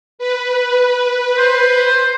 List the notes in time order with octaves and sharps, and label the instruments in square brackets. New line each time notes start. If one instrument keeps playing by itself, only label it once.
[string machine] B4
[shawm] C5